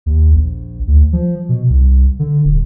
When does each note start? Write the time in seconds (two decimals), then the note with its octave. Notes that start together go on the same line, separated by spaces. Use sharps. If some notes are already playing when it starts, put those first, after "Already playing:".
0.06 D#2
0.35 A#1
0.87 D2
1.13 F3
1.49 B2
1.70 C2
2.19 D3
2.45 D#1